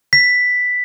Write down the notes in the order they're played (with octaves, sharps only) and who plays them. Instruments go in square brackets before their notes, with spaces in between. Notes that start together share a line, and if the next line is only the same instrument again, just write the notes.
[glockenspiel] B6